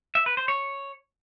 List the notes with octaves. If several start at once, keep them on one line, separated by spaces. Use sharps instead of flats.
E5
B4
C5
C#5